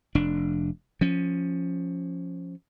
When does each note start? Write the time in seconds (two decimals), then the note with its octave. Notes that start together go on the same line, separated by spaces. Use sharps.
0.15 F1 D4
1.01 F3 C#4